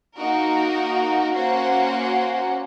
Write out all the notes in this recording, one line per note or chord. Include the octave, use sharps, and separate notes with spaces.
A#3 D#4 F#4 A#4
A#3 C#4 F#4 C5 F#5